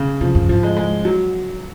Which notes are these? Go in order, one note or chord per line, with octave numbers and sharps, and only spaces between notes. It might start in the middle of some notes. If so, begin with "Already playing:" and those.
Already playing: C#3
C3 F3
F#2
G#2 F3
G#3
G#3
F#3